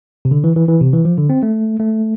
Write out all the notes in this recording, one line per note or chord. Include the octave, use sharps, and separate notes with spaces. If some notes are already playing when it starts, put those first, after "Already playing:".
C3
D3
E3
E3
E3
C3
E3
F3
D3
C4
A3
A3